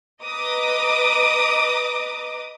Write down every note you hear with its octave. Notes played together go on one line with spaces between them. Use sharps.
B4 D#5 A#5 D6 D#6